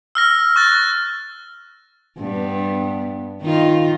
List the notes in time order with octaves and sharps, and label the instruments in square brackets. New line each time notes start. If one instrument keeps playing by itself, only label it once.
[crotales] E6 F6 A#6
C#6 F#6 A6
[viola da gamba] G2 B3
D#3 D#4 F4